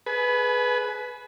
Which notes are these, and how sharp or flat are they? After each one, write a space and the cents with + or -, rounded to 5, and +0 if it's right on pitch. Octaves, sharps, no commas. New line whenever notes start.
G#4 +25 B4 +0 G#5 +45